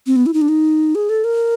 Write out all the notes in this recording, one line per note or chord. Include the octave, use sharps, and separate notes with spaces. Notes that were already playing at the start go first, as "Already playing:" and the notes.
C4
B3
E4
D#4
D4
D#4
G#4
A4
A#4